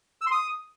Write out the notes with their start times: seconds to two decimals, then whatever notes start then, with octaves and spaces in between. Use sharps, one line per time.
0.21 E6
0.26 C6
0.32 D#6